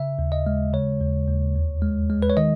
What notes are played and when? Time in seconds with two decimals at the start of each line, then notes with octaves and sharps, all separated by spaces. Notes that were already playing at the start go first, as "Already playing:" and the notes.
Already playing: C#3 E5
0.19 D#2
0.32 D#5
0.47 G#3
0.73 C#3 C#5
1.01 D#2
1.28 D#2
1.55 E2
1.82 G#3
2.10 G#3
2.22 B4
2.30 C#5
2.37 D#3 D#5